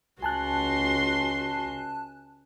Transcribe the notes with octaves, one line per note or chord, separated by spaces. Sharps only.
C#2 F#4 G#5 A5 C6 F#6